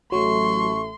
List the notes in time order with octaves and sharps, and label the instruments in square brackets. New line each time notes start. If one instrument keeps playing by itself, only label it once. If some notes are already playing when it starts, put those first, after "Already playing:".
[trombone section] A1 A3 [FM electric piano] F#3 [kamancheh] C6 [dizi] C#6